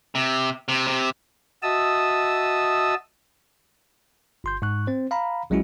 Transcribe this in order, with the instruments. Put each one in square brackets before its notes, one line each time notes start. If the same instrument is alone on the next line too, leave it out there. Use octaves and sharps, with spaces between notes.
[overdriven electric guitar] C3
C3
C3
[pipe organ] F#4 D#5 E5 A5 D#6 E6
[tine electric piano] G1 C6 G6
G#2 C#6 F#6
C4 C5
F5 A#5 B5
A#1 F#3 G#3 C#4 E4 F#4